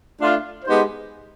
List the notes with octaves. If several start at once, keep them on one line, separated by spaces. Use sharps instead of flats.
A3 D4 F4
G#3 B3 D#4 G4 C5